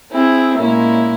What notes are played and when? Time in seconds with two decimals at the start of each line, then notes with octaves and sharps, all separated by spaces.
0.10 C4 E4 G#4
0.59 A#2 G#3 A#3 C#4 E4